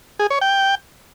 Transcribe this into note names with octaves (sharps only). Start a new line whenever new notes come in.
G#4
C#5
G5